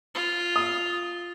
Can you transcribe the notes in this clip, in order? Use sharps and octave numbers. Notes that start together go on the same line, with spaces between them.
F4
D#6